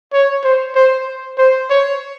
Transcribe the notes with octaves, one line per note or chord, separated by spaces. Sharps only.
C#5
C5
C5
C5
C#5